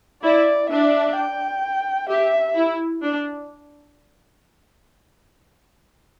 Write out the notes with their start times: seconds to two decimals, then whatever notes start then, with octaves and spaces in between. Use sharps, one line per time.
0.23 E4 D5
0.70 D4 E5
1.16 G5
2.09 G4 E5
2.56 E4
3.02 D4